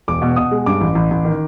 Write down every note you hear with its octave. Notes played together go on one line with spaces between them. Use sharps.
E1 D6
B2
B2 D#6
G#3
G2 D6
A1
A1
A1
D#3